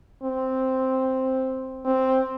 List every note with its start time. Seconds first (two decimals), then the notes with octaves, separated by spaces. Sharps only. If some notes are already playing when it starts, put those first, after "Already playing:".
0.23 C4
1.85 C4